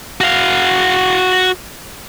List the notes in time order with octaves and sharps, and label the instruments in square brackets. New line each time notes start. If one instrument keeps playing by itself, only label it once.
[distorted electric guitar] F#4 F5